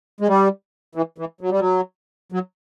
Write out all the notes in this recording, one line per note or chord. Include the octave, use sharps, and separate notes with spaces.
G#3
G3
E3
E3
F#3
G3
F#3
F#3